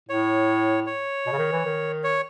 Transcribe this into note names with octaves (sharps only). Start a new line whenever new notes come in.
A2 C#5
C#5
B2
C#3
D#3
E3
D#3
C#5